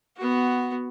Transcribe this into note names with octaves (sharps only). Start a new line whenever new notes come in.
B3 F#4